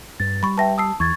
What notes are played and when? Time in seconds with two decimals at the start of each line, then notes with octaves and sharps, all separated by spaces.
0.20 G2 A6
0.43 G3 B5 C#6
0.58 B4 E5 G5 A5 A#6
0.78 A5 D#6 E6 C7
1.00 E2 C#6 G#6 A6